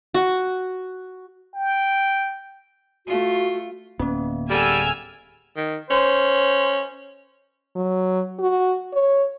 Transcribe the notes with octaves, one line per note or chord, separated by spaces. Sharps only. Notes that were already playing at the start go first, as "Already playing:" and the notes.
F#4
G5
A3 F4 F#4
D1 A#3 B3 C#4
G3 G#4 A4 F#5 G#5 E6 F6
D#3
C#4 C5
F#3
F#4
C#5